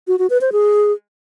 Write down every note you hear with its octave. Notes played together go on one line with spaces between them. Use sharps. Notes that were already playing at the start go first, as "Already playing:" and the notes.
F#4
F#4
B4
C5
G#4